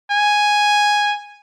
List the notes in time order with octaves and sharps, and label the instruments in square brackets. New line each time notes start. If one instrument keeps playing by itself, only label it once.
[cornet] G#5